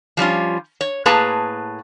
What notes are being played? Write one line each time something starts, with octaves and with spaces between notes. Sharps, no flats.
F3 G3 C#4 F4
C#5
A2 A#3 G#4 B4 A5 A#5